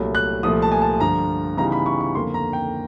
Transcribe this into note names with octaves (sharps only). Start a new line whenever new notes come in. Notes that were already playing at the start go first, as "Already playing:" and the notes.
Already playing: C2 A#2 F#3 A3
F#6
C2 A#2 F3 A3 D#6
A5
G#5
A5
G2 D3 F3 A#5
C#3 E3 G3 B3 D#4 A#5
B5
C#6
C#6
F2 D3 F3 A#3 C6
A#5
G5